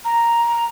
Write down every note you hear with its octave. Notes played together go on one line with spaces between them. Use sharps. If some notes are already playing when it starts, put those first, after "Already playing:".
A#5